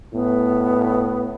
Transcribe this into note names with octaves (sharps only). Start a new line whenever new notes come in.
A2 B3